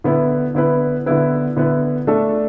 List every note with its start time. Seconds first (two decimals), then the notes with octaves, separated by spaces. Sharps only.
0.04 D3 B3 E4 B4
0.55 D3 B3 E4 B4
1.06 D3 B3 E4 B4
1.57 D3 B3 E4 B4
2.07 A3 D4 A4